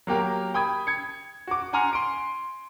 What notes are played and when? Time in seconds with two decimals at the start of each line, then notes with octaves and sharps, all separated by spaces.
0.07 F#3 A#3 G4 A#4
0.54 G5 B5 D#6 G#6
0.87 G#6 C#7
1.47 F#4 D6
1.73 F#5 G#5 A#5 C6 F6
1.93 C6 D7